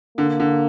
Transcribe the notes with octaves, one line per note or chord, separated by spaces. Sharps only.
D3 A#3
D3